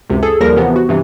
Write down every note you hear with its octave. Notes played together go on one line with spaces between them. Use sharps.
C#2 F#2 C3
G#4 A4
D#2 F3 G3 A#4 A#6
C3 E3 F3 B3
F#4
G2 C3 E3